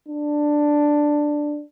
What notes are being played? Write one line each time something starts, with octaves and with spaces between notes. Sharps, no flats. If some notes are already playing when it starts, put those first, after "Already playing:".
D4